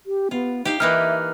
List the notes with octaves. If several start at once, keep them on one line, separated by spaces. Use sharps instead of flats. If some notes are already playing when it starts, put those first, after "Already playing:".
G4
B3 F4
D#4 G4 F5
E3 A#3 D#4 E5 F6 F#6